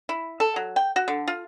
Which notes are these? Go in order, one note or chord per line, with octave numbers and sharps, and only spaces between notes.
E4
A4
F#3
G5
F#4
D3
F4